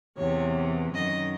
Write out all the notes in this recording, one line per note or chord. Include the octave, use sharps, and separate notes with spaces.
E2 C3 E3 C#5
F#2 D#3 D#5